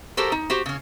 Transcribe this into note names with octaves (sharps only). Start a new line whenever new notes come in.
F#4 G4 A4 A#4 C5
D#4
F#4 G4 C5
C#3 C#4